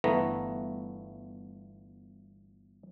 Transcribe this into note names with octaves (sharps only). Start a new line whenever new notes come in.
G1 E3 A3 B3 A#5